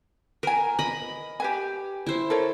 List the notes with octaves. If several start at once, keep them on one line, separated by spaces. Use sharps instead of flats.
A#4 B4 G#5
D#5 B5
G4 B4 G#5
E4 C5
A4 A#4 C#5